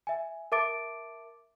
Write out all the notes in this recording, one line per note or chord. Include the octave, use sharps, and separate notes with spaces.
E5 G#5
A#4 E5 A5 D6 A6 D7